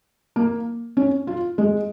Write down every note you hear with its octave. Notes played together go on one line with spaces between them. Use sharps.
A#3
C#4
F4
G#3